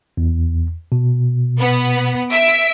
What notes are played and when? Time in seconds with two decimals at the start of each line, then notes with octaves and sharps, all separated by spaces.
0.17 E2
0.92 B2
1.59 B3
2.30 E5 D7